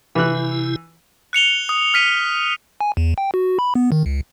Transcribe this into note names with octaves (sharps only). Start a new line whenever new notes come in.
C3 E3 E4 F#6
F#6 C#7 F7 G7
D#6
F6 B6 D#7
G#5
E2
G5
F#4
B5
B3
D#3
C#2